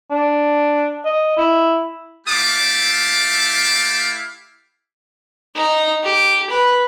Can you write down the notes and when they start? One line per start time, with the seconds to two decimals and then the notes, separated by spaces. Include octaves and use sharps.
0.10 D4
1.05 D#5
1.37 E4
2.27 A3 E4 G4 F5 A5 D6
5.55 D#4
6.04 G4
6.50 B4